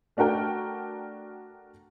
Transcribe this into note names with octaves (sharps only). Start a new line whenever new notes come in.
A3 D4 F#4 A#4 G5